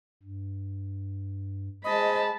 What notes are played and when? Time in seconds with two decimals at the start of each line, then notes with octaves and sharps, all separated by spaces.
0.23 G2
1.84 G#3 C5 D#5 A5 B5